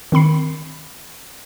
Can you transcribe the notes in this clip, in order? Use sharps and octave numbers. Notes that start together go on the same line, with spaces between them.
D#3 C4 B5 C7